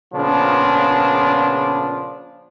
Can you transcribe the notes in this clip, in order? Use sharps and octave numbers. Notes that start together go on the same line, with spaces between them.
A#2 C#3 F3 B3 D4